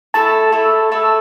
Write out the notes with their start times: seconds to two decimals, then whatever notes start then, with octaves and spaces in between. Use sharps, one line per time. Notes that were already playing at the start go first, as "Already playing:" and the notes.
0.14 A3 E4 A4 A5
0.52 A3 E4 A4
0.92 A3 E4 A4